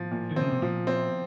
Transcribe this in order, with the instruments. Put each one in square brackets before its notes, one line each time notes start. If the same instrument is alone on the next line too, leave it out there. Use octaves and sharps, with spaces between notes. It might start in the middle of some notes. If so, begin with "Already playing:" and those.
Already playing: [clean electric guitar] A2 [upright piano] F3
[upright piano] A#2
[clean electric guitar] D#3
[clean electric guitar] C#3 [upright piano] C4
[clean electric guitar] C3
[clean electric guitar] A#2 [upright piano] F3
[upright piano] C4